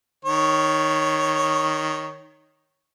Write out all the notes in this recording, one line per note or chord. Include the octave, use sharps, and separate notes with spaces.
D#3 C#5